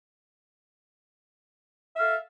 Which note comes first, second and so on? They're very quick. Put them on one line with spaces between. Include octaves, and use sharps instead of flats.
E5 F5 A4